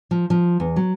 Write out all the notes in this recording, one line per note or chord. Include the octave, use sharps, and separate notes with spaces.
F3
F3
E2
F#3